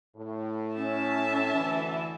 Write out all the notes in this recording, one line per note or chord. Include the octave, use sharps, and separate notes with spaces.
A2
C#4 E5 A5
D2 E3